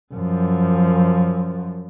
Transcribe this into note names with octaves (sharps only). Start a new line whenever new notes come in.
F#2 F3